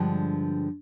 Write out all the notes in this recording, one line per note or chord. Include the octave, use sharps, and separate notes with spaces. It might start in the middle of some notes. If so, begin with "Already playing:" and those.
Already playing: G2 D3 F3 G#3